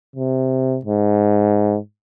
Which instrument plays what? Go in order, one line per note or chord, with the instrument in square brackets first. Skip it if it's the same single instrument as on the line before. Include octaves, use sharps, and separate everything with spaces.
[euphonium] C3
G#2